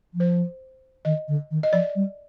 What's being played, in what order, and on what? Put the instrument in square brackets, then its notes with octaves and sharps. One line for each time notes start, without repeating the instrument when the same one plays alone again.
[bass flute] F3
[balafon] C5
[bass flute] D#3 [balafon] D#5
[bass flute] D3
D#3
[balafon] D#5
[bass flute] F3 [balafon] D5
[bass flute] G3